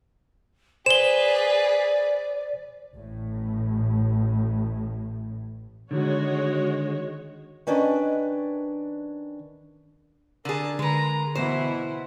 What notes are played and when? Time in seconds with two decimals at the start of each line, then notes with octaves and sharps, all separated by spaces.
0.86 G#4 B4 C5 D5 E7 G7
2.93 A1 A2
5.91 D3 D#3 G#3 F#4 C#5
7.67 D#3 C#4 D4 B4 D#5
10.45 D3 G#4 A#4 A5
10.79 D3 G#3 A#4 B4 A#5
11.35 B2 E3 E4 C5 F#5